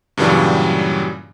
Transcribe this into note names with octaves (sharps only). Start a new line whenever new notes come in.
G2 A#2 C#3 E3 F#3 G3